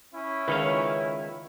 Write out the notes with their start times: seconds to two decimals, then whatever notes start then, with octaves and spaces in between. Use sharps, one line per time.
0.14 C#4 E4
0.48 C#2 D#3 B4 C#5 F5